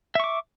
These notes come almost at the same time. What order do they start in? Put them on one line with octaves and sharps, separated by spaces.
E5 C#6 D6